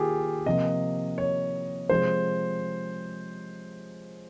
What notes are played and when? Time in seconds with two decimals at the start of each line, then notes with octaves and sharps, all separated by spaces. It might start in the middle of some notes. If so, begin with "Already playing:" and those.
Already playing: D#3 A#3 F4 G4 G#4
0.46 C3 F3 A#3 D#5
1.18 C#5
1.89 C3 F3 G#3 C5